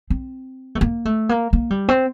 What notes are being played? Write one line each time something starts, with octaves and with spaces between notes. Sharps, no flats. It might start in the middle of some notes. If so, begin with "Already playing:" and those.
C4
A3
A#3
A3
A#3
A#3
G3
C4